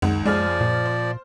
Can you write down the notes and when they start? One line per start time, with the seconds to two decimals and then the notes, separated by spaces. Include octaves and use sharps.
0.02 C#2 F#2 D#3 F#5
0.26 F#1 F3 G#3 G#4 D5 F6
0.61 A#2
0.86 C5